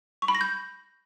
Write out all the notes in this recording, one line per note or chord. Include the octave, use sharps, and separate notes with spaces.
C#6
B5
A#6
G6